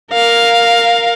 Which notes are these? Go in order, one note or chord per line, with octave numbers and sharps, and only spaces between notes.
A#4 F5